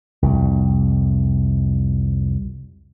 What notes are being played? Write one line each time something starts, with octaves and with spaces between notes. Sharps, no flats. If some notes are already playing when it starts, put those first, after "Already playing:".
C2 F2